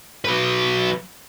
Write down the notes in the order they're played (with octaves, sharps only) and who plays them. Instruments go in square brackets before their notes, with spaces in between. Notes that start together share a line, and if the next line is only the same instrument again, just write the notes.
[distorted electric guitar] F#3 B4